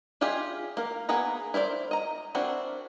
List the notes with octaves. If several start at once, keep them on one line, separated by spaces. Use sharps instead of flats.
E4 F4 G4 G#4 D#5
A#3 A#4
A#3 B3 G#4 B4 A#5
E4 A#4 C5 D5
D#5 A#5
C4 D4 E4 F#4 A#4